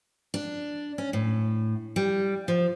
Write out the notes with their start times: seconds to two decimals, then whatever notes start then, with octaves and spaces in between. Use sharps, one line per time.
0.34 D4
0.98 C#4
1.13 A2
1.96 G3
2.48 F3